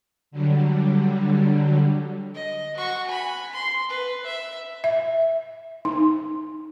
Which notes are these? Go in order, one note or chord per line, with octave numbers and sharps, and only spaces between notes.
D3 F#3 G3
D#5
F#4 C#6
G#5 B5
C6
B4
E5
E5
D#4